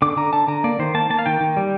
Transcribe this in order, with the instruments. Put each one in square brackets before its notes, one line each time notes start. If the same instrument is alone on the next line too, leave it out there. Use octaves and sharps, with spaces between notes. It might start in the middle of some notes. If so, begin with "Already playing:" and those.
[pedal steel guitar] D3 D6
D3 A#5
D3 A5
D3 A#5
A#3 D5
D#3 C5
A#3 A5
A#3 A5
F5
D#3 G5
D#3
G3